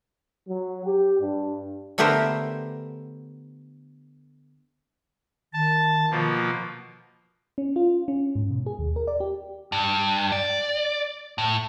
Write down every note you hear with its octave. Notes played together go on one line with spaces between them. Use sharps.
F#3
G4
G2
D3 A3 B3 G4 A#4 C5
D#3 A5
B2 F3 A#3
C#4
F4
C#4
G#2
B2
G#4
D#2
A#4
D5
G4
G2
D5
A2